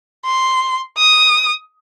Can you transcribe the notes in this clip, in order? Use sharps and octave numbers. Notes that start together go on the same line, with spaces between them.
C6
D#6